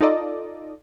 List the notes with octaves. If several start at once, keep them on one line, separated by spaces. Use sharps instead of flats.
D#4 F4 A4 D5 D#5